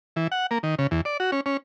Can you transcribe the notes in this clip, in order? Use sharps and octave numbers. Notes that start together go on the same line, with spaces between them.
E3
F#5
A#3
D#3
C#3
E2
D5
F#4
C#4
C#4